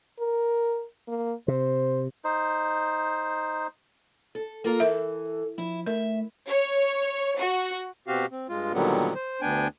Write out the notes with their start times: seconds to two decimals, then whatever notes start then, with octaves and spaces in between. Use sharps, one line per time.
0.19 A#4
1.08 A#3
1.48 C3 C5
2.24 D#4 C5
4.35 A4
4.64 A#3 F4 A4 A#4
4.80 E3 A#4 E5
5.58 F3 E4
5.86 A3 A#4 E5
6.47 C#5
7.37 F#4
8.08 B2 C4 F#4 G4 F5
8.32 C4
8.49 G2 G#3 F4
8.73 A#2 D3 D#3 F#3 G3 B3
9.15 C5
9.41 D2 B3 D4 G5 G#5